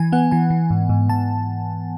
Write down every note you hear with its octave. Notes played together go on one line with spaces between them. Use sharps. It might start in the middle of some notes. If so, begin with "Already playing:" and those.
Already playing: E3 G#5
B3 F#5
E3 G#5
E3
G#2
G#2
G#2 A5